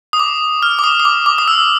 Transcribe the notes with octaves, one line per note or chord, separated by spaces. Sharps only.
D#6
D6
F6
D6
D#6
D#6
D6
D6
D#6
E6